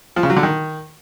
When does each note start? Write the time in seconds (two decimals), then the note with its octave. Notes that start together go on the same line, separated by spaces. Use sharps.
0.16 F3
0.23 C#3
0.30 F#3
0.36 D3
0.43 D#3